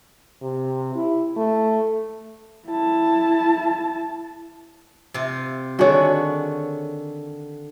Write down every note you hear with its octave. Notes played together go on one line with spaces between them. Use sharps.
C3
E4
A3
E4 A5
C3 F4
D3 D#3 F#4 G#4 C#5